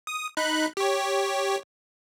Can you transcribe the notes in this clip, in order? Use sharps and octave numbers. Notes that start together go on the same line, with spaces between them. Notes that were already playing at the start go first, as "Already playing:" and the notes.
D#6
D#4 B5 F#6
G4 C#5